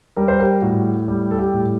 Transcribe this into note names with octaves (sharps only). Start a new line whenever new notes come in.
G3 A#4
C5
G4 A#4
A2 F#4
G3 G4
A4
G4
A2